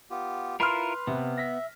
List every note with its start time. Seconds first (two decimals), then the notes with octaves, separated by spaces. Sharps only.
0.11 B3 F4 G4
0.60 E4 F4 A#4 B4 B5 C6 F6
1.07 C3 B3
1.37 E5 A#6 B6